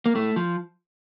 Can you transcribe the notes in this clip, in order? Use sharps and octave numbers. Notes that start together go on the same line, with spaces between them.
A#3
A2 A3
F3